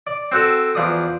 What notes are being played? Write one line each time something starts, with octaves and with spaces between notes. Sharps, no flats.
D5
C4 F#4 A4
E2 F3 D5 D#6